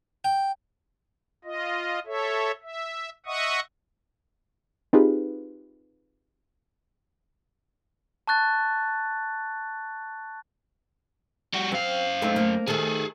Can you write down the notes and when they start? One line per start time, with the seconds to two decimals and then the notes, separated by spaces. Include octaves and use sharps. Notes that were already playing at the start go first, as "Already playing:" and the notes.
0.24 G5
1.44 F4 D#5
2.06 A4 C#5 E5
2.63 E5
3.26 D#5 E5 F#5 C#6 D#6
4.93 C4 D#4 F4 G4 G#4 B4
8.27 A5 C#6 F#6 A6
11.54 G3 F#4
11.72 F#2 C4 F5
12.22 A3 C4 D#4
12.36 A#3
12.68 D#3 A3 G#4 A4